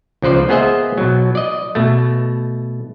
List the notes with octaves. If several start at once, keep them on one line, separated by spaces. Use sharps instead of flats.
C#2 F3 B4 C5 D5
A#3 B3 G#4 C5 D#5 E5
B2 F#3
D5 D#5
B2 A3